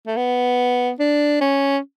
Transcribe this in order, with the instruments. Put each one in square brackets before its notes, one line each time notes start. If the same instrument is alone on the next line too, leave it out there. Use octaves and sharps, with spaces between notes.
[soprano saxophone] A3
B3
D4
C#4